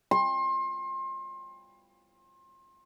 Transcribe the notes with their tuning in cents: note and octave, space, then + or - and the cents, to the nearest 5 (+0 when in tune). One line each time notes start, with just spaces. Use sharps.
C6 +30